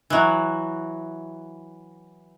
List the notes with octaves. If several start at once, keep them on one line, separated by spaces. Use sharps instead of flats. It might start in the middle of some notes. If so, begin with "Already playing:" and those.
E3 F#3